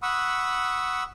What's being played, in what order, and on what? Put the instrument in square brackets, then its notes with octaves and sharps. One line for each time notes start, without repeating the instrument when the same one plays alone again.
[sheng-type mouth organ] F#5 B5 C#6 D#6 E6